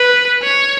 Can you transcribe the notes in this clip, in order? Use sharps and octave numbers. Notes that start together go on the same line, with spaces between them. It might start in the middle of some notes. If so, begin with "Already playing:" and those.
Already playing: B4
C#5